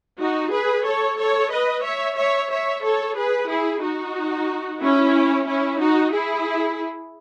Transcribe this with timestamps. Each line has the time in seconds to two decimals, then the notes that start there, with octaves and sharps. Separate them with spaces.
0.19 D#4 F#4
0.51 G#4 B4
0.84 A4 C#5
1.17 A4 C#5
1.51 B4 D#5
1.83 C#5 E5
2.16 C#5 E5
2.51 C#5 E5
2.83 A4 C#5
3.16 G#4 B4
3.48 E4 G#4
3.82 D#4 F#4
4.81 C#4 E4
5.47 C#4 E4
5.79 D#4 F#4
6.13 E4 G#4